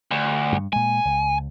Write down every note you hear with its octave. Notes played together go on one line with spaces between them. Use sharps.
D2
G2
A#2 G#3 G#5
C#2